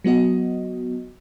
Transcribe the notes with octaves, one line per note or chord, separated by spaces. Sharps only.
F#3 B3 F#4 D#5